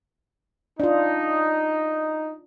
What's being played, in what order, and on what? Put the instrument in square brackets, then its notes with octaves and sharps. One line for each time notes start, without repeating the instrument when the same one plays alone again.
[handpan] D4 F4 [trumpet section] D#4